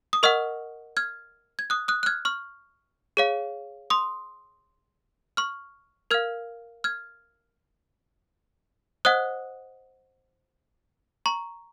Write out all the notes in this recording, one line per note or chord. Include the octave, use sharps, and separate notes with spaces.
D#6
A#4 D#5 F#5 C#6 F6
F6 G#6
G#6
D#6 F#6
D#6 F#6
F#6
F6 G#6
C#6 F6
G#4 C#5 F5
C6 D#6
C#6 F6
A#4 F5 F6 G#6
F6 G#6
C5 D#5 F#5 D#6 F#6
A#5 C#6